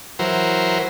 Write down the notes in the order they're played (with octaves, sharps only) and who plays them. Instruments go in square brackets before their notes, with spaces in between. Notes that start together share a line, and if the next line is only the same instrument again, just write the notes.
[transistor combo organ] E3 F#3 A#4 C5